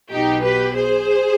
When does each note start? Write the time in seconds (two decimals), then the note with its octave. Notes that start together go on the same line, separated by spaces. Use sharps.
0.11 B1 B2 D#4 G4
0.43 G4 B4
0.75 G#4 C5